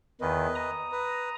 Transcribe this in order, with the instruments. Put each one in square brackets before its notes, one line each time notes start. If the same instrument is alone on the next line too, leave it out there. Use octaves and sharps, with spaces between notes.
[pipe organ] E2 D#3 [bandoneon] B4 D#5
[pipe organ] A#5 D#6
[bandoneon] B4